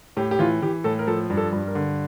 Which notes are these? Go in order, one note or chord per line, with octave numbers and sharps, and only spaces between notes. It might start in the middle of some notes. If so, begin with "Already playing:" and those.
A2 G4
G4
E3 F4
E3 G4
A2 A4
A#4
F3 A4
G2
A4
G2
A#4
D3